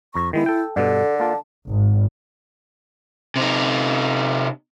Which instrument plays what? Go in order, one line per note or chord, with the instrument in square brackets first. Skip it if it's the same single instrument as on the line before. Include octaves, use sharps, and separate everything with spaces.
[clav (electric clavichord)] F2 A#5 [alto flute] C#6
[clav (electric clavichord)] D#3 G#3 B3 [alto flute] E4
[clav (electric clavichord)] A4 G5
[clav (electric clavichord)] G2 B2 [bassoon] D3 [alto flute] A4
[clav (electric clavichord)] A#3 F4 [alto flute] A5
[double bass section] G#1
[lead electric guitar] C3 D#4